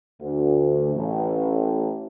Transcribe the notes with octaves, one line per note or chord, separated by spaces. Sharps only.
D2
A1